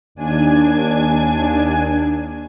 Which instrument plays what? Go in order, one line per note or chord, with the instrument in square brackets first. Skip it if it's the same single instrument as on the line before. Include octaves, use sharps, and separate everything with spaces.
[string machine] D#2 D4 G#5 G#6